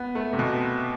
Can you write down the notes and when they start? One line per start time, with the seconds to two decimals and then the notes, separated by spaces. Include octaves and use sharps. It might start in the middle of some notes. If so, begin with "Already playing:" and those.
Already playing: B3
0.15 A3
0.33 C3
0.39 B2